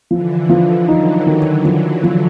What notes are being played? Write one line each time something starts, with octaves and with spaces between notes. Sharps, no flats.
D3 E3 F3
F3
E3 F#3 D#4
D#3
F3
F3